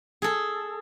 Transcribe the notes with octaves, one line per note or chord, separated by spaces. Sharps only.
G#4 A4